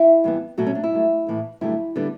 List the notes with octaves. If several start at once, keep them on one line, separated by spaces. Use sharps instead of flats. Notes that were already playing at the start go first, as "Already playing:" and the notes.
Already playing: E4
G2 E3 B3
B2 F#3 A3 F#4
C#4
D4
E4
G2 F#3 A3
A2 E3 A3
G2 D3 F#3 A3 E4
D3 G3 B3